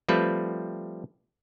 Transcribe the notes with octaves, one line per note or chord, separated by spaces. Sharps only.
F3 G3 A3 C4 B4